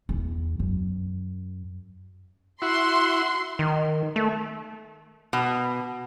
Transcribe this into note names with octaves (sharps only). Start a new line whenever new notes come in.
E2
F#2
E4 F#4 C6
D#3
A3
B2